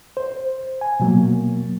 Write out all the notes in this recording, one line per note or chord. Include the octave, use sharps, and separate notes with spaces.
C5
G#5
B2 F#3 A#3